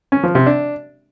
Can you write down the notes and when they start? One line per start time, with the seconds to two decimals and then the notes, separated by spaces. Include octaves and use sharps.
0.12 C#4
0.23 F3
0.35 C3
0.46 D4